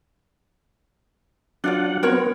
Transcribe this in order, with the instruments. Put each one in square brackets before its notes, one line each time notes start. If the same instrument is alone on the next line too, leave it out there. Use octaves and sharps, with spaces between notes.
[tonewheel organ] F#3 F#5 [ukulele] D4 F4 D5
[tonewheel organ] B3 C4 [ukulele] F#4 A#4 C#5